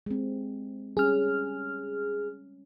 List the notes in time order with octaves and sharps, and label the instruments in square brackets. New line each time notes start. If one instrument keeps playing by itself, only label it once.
[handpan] G#3 C4
[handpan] G3 C#4 [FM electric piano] G#4 F6